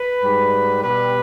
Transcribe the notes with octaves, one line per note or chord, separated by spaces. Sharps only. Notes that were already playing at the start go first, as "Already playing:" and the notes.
Already playing: B4
G#2 G3
B2 G3 B4